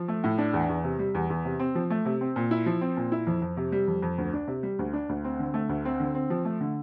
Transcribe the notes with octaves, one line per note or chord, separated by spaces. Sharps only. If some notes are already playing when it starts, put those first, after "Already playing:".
Already playing: F3
A3
A2
D4
E2
E2
C3
G3
E2
E2
C3
C4
F3
A3
C3
C4
A#2
E4
F3
C4
A#2
E4
F2
F2
C3
G3
F2
F2
D2
D4
C3
G3
D2
D4
D2
C4
D3
A3
D2
C4
D3
C4
F3
A3
D3